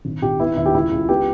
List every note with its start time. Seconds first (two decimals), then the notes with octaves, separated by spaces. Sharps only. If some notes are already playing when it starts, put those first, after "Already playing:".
0.05 G#1
0.22 G#1 G4
0.40 B3 E4
0.57 D#2 E4
0.66 G4
0.74 C#2 E4
0.92 C#2
1.09 B3 G4